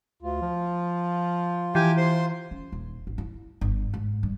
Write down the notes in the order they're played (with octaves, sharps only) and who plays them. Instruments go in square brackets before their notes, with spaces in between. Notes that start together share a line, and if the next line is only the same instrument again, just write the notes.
[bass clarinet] D2 [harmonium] F4
[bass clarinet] F3
[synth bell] E3 [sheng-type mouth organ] G4 G5 G#5
[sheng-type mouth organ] C5 C6
[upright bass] C#4
D#1
G#1
E4
G1
G#2
G2